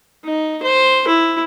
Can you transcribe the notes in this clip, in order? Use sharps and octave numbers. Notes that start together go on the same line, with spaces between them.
D#4
C5
E4